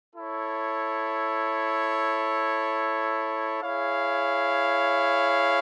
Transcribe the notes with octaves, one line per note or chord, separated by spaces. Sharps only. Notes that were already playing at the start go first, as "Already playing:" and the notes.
E4 A4 C#5
E4 G#4 C#5 F5